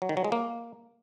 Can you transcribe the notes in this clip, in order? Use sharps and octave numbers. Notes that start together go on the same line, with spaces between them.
F#3
D#3
F#3
G#3
A#3